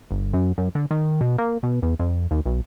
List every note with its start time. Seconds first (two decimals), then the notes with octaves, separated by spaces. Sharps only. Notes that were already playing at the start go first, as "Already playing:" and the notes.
0.11 G1
0.33 F#2
0.58 F#2
0.75 D3
0.91 D#3
1.21 B2
1.38 A#3
1.63 B2
1.82 E2
1.99 F2
2.31 D#2
2.46 B1